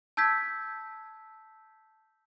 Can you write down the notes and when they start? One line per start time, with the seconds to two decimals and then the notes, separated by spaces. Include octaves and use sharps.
0.17 A5 E6 G6 G#6 B6